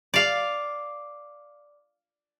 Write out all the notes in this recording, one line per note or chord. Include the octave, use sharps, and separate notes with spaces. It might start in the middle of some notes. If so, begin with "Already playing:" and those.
D5 F5